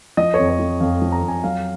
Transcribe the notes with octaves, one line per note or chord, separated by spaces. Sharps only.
F3 D#5
C#5
F2
C#5
F3
F2 F5
F3
A#5
F2
G#5
F#3 F5